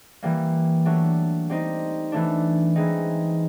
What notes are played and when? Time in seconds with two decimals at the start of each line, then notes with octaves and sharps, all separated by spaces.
0.23 E3 G3 A#3
0.85 F#3 A3 D4
1.49 G3 C4 D#4
2.12 E3 A3 D4
2.76 E3 G#3 C4 D#4